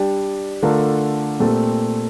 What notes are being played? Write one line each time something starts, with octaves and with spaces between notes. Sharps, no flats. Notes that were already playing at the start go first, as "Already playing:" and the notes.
Already playing: G3 D4 G4 D5
D3 A3 D4 F4 A#4
A#2 A3 C4 G4